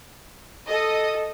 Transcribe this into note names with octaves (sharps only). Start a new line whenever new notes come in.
A4 D#5